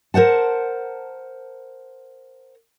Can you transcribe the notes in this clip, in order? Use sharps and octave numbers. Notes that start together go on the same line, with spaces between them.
A#4 C5 F#5 A5